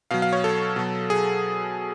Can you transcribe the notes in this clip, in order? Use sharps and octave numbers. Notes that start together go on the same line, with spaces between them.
B2 F#3 F5
F5
C#5
A4
B2 F#3
G#4